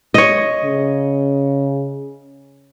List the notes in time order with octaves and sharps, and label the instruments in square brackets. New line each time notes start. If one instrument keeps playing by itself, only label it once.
[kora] C#5 D#5
[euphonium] C#3